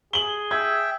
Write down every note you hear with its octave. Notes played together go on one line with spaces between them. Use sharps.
G#4 F#7 G7
E5 G5 G#6